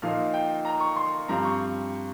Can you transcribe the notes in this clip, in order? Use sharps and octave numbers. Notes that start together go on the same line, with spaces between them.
A#2 F3 A#3 D#4 F5
G5
A#5
C#6
C6
G2 F3 C4 A#5
C#6